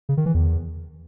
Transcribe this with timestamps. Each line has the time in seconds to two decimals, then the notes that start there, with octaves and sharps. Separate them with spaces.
0.09 C#3
0.17 D#3
0.26 E3
0.34 E2